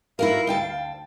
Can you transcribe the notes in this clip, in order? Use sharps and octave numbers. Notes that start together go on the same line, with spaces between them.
E4 F#4 A#4 F5
D2 G5 A5